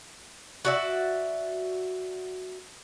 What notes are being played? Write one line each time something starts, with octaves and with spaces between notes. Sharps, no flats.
F#4 D5 E5